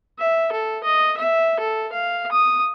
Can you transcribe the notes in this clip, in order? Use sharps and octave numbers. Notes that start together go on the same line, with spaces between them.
E5
A4
D#5
E5
A4
F5
D#6